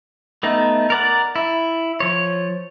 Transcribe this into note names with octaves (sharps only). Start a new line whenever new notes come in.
A3 B3 D#4
A#4 D5 F#5
E4
F3 C#5